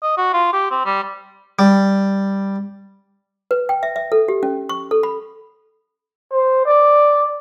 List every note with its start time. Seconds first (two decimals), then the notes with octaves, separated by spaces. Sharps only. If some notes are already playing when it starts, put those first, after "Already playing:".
0.03 D#5
0.18 F#4
0.33 F4
0.53 G4
0.71 C4
0.85 G3
1.59 G3
3.51 B4
3.69 G5
3.83 E5
3.96 E5
4.12 A4
4.28 G4
4.43 C#4
4.69 C#6
4.91 A4
5.03 B5
6.32 C5
6.66 D5